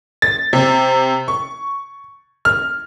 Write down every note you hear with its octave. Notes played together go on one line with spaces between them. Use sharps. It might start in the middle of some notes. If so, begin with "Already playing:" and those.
A6
C3
C#6
F6